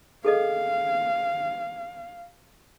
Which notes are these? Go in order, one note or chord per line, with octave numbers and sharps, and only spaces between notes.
G#4 A4 D#5 F5